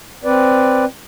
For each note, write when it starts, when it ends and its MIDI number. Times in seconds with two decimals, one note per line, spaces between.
0.24 0.85 60
0.24 0.85 71
0.24 0.85 74